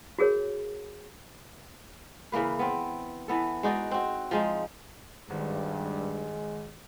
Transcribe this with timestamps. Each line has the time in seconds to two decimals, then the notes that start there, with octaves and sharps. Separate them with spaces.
0.18 F#4 G#4 A#4 C#5
2.32 C#3 E3 A#3 B4
2.59 B3 C4
3.28 E3 B3 A4
3.63 G#3 D#4 F#4 D5
3.91 C4 F#4
4.31 F3 G#3 D#4
5.30 G#1 G2 G#3